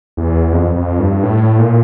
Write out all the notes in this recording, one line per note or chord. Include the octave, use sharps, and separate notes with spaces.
E2
F2
F2
G2
A2
A#2